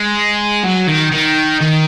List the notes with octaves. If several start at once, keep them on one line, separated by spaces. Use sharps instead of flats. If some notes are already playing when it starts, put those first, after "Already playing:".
Already playing: G#3
F#3
D#3
D#3
D#3